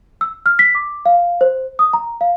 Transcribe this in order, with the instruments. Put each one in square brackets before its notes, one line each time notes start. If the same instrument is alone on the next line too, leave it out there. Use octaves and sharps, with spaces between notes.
[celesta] E6
F6
B6
D6
F5
C5
D#6
A#5
F5